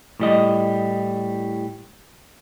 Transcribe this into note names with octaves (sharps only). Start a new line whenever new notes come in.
A2 G3 D#5